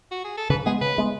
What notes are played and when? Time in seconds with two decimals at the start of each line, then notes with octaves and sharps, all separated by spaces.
0.11 F#4
0.24 G#4
0.37 A4
0.50 C#3 B4
0.66 G#3 B3 G#4
0.81 C#3 B4
0.98 G#3 B3